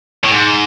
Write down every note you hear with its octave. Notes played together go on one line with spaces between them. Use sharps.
A2
G#2